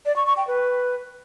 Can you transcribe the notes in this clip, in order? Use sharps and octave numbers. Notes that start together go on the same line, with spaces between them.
D5
C#6
C#6
G5
B4